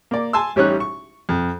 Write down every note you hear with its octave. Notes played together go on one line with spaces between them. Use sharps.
A#3 D5
G#5 A5 C6 E6
A1 G3 C#4 D#4 C#5 F#6
C#6
F2